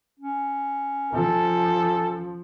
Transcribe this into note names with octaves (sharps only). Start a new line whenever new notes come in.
C#4
F3 A4